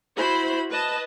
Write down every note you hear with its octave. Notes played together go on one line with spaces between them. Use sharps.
E4 F#4 C5 B5
B4 D#5 A5